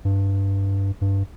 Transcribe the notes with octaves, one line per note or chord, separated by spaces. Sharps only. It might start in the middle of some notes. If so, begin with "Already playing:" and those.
G2
G2